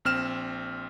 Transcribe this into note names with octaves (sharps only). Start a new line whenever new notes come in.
A#1 C4 F6 E7